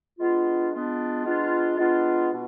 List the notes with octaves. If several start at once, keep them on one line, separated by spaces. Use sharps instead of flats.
G#3 B3 D4 F4
G#3 B3 D4 F4
G#3 B3 D4 F4
G#3 B3 D4 F4
B2